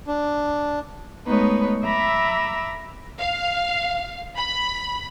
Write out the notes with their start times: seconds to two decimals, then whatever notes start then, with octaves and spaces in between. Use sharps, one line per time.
0.07 D4
1.26 G#3 A3 B3 D#4 B4 C#5
1.83 E5 A#5 B5 D6 E6
3.19 F5
4.37 B5